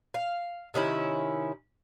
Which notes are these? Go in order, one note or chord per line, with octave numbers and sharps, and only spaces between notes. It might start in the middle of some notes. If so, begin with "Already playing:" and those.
F5
C3 D#3 C#4 E4